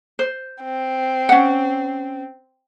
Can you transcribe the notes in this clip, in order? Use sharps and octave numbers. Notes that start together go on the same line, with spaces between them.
C5
C4
C#4 F#5